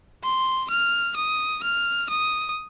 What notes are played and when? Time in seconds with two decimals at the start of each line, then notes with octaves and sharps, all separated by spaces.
0.23 C6
0.70 F6
1.16 D#6
1.63 F6
2.10 D#6